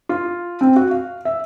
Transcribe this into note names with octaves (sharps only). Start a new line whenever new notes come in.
F4
C4
F#4
F5
E5